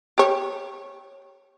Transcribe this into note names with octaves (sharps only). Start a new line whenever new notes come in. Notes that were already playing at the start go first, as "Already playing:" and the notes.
G4 C#5